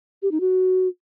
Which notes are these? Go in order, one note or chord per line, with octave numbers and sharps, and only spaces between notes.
G4
D#4
F#4